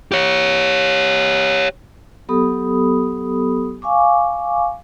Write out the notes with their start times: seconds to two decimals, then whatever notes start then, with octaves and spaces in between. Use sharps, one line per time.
0.12 G4 C#5
2.29 F#3 B3 G4 A4 B5 D#6
3.82 F5 G#5 C#6 D6